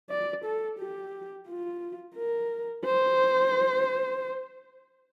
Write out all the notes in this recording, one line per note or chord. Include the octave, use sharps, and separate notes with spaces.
D5
A4
G4
F4
A#4
C5